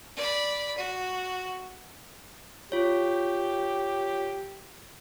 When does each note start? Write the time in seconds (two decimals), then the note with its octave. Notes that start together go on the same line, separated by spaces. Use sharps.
0.16 D5 B5
0.77 F#4
2.72 F4 G4 C#5